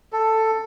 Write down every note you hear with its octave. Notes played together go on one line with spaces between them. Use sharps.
A4